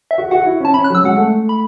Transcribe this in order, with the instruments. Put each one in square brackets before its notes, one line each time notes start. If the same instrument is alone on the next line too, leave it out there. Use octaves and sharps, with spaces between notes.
[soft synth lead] E5
[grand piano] F#4
[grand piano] F#4 [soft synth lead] F#5
[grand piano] E4
[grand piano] C#4 [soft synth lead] A5
[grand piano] C#4 [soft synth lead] B5
[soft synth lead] F#6
[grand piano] F#3 [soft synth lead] E6
[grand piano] G#3 [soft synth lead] F#5
[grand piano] A3
[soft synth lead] B5